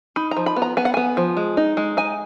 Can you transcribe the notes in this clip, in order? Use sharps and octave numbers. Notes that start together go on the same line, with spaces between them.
D#4 B5
A#5
F3
B5
B3
A#5
B3 G#5
F#5
B3 G#5
F3
G#3
D#4
G#3
D#4 G#5